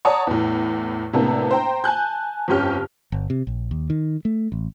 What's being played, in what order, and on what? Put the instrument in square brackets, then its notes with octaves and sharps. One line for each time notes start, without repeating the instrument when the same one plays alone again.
[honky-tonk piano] C#5 D5 F#5 A5 A#5 D#6
E2 A2
A2 C3 A#3 B3 D4
C5 G5 A#5
G#5 A5 F#6 G6
G1 F2 C#4 G4 F6
[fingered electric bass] G1
C3
A#1
D#2
D#3
A3
A1